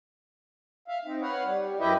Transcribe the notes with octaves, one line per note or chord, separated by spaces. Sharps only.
E5 F5
C4 D#4
B4 C#5 F5 F#5
G3
F#2 E4 G4 B4 D#5 E5